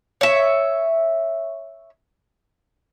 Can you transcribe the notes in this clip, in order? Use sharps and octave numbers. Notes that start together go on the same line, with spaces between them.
C#5 E5